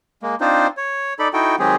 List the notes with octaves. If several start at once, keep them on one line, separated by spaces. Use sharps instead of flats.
G#3 A#3
C4 D4 D#4 F4 C5
C#5
D#4 A4 D5 B5
D#4 E4 F#4 A4 G5
D#3 F#3 G#3 C4 G4 G#4